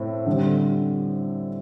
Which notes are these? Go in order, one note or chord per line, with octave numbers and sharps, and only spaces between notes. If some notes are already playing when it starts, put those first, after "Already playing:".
Already playing: A2 C4
D3 G3 C4